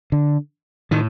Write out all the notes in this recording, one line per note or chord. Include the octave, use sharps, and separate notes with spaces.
D3
A2 D#3